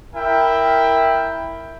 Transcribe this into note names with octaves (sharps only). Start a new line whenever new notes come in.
E4 A#4 E5 G5